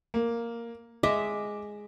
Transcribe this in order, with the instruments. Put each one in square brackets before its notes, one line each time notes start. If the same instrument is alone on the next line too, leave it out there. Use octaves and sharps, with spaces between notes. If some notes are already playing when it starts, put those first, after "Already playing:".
[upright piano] A#3
[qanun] G#3 D#5 E5 [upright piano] D6